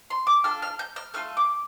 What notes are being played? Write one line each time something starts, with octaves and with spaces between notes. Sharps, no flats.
C6
D6
D4 F4 A4 F6
F6
G6
F6
A3 F4 A4 F6
D6